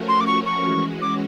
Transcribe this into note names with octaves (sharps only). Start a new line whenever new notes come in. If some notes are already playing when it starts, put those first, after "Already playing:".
Already playing: F3 A3 C#4 F#4 A#4
C6
D6
C#6
C#6
E3 G#3 C#4 F#4
D6